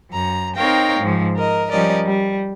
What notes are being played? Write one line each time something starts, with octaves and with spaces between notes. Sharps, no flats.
F#2 A#5
C4 D#4 A#4 C#5 F5 G5
G#2 F3
A#4 D#5
F3 G3 C#4 A#4 D5 D#5
G3